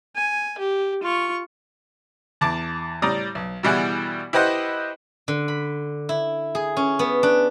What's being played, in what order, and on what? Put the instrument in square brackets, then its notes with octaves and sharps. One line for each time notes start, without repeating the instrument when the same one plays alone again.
[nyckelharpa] G#5
G4
F4 C#6
[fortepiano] E2 A5 D6
A2 G3 D5 A#5 D#6
B1
B2 E3 G3 E4 F#4 G#4
E4 G4 B4 C5 D#5 F#5
[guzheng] D3
B5
E4
G#4
C#4
B3
D4